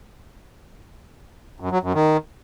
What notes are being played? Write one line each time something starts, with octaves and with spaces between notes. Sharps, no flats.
F#2
F#3
F#2
D#3